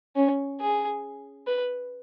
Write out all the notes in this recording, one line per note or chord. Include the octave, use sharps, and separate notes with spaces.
C#4
G#4
B4